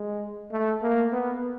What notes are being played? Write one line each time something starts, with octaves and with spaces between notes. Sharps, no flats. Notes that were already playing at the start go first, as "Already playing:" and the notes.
Already playing: G#3
A3
A#3
B3